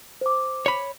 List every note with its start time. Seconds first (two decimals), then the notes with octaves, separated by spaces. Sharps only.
0.21 C5 D6
0.66 C#5 B5